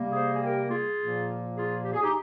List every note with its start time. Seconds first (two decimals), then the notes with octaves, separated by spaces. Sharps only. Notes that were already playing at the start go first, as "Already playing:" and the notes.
Already playing: C3 G3 A#3
0.12 G#4 C5
0.34 G#4
0.40 G4 A#4
0.69 F4 G#4
0.97 A#2 F3 A#3
1.56 F4 G#4
1.84 G4
1.93 G#4
2.02 D#4 G4